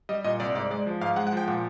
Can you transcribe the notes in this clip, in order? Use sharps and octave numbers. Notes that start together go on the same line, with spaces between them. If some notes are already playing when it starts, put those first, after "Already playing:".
G3 D#5
A#2 D#5
C2 D5
G#2 D5
G#3 D5
F3
G#2 F5
G#3 F#5
F#5
F3 G5
A#2 F#5